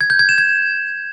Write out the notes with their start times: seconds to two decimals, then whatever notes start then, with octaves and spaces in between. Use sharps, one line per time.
0.01 G#6
0.10 G6
0.19 G#6
0.29 E7
0.38 G#6